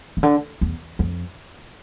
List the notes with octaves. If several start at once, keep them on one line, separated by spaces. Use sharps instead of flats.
C3
D3
E2
F2